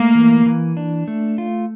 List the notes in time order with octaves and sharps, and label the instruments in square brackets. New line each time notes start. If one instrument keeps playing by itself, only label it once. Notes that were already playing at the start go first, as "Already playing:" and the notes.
Already playing: [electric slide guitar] A3 [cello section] A#3
[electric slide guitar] E3
E3
D4
A3
F4